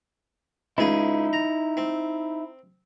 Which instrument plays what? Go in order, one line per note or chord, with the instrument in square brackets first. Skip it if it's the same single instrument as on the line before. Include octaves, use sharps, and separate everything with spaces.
[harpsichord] C#2 G#4 D#6 [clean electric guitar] D#4 E4
[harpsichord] A#5
C4